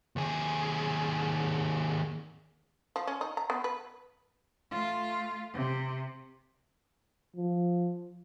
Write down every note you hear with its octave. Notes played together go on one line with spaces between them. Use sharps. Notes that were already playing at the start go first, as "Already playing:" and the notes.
D#2 G#4
F3
C#4
D#4
A#5
B3
B4
A3 F4
C3
F3